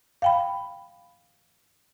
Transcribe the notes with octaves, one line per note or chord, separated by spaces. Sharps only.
F5 G5 B5